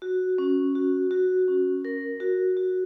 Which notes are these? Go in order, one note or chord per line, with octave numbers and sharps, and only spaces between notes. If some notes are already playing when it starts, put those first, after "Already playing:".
F#4
C#4
F#4
F#4
C#4
A#4
F#4
F#4